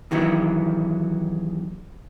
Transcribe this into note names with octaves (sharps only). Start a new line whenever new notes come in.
D#2 D#3 E3 F#3